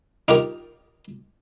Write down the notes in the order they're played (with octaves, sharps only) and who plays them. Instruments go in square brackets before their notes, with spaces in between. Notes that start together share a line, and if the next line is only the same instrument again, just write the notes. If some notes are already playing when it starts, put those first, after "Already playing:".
[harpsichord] D#4 F4 G4 A#4